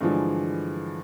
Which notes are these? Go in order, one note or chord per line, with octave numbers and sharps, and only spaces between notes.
G2 D3 E3 F3 G#3